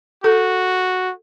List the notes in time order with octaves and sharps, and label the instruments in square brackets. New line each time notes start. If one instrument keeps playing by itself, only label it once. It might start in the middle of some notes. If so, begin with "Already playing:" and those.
[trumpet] F#4 [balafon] A4